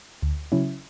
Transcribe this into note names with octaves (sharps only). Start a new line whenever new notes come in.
D2
C#3 F#3 C#4 E4